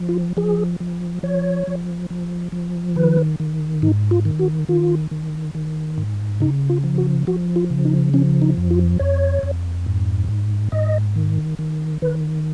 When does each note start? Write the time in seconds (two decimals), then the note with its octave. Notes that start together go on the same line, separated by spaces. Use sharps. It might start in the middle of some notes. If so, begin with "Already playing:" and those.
Already playing: F3
0.09 F4
0.37 F3 G#4
0.80 F3
1.23 F3 C#5
1.67 F3
2.10 F3
2.52 F3
2.96 D#3 B4
3.40 D#3
3.82 G#2 D#4
4.11 F4
4.25 D#3
4.39 F#4
4.68 D#3 F4
5.11 D#3
5.55 D#3
5.98 G#2
6.40 C#3 D#4
6.70 F4
6.84 F3
6.98 F#4
7.27 F3 F#4
7.56 F4
7.70 C#3
7.85 D#4
8.14 F3 C#4
8.42 D#4
8.57 F2
8.71 F4
8.99 F2 C#5
9.43 F2
9.86 G#2
10.29 G#2
10.72 G#2 D#5
11.16 D#3
11.59 D#3
12.02 D#3 B4